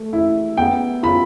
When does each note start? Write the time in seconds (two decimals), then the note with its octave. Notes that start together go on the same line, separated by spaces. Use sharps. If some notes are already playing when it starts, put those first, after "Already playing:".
Already playing: A3
0.13 E4
0.57 B3 G5
1.03 F4 B5